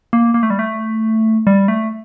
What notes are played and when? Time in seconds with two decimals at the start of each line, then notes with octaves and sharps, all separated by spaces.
0.13 A#3
0.34 A#3
0.43 A3
0.50 G3
0.59 A3
1.47 G3
1.68 A3